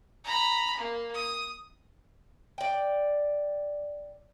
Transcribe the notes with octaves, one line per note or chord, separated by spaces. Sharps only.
A#5 B5
A#3
D#6
D5 G5